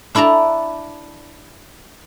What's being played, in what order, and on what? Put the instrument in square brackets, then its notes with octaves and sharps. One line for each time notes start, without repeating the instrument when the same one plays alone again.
[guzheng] D4 E4 D5 A5 A#5